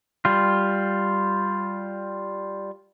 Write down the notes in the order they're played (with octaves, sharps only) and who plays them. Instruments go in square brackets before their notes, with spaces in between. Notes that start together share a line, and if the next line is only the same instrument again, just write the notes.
[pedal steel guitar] G3 F4